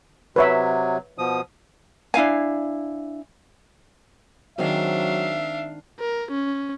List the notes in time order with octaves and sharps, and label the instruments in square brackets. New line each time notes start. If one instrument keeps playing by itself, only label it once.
[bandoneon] C3 F#3 [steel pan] B4 C#5 E5
[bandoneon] B2 F3 D#6
[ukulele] D4 E4 F5 G#5
[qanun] D#3 G#3 C4 [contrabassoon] F#3 [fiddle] D4 F5 [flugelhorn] E5
[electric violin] A#4
C#4